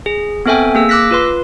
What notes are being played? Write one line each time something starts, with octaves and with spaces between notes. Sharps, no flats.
G#4
B3 C4 A4 E5 G5 G#5
A#3 G#4 E6
D6 E6 F#6 A#6 B6
F4 B4 C6